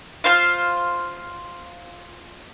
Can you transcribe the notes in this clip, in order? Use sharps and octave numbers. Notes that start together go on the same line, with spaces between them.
F4 C5 F5